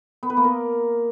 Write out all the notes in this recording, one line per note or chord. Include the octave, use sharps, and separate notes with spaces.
B3
B4
A#3
A#4